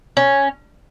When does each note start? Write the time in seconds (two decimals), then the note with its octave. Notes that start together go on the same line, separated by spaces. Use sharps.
0.17 C#4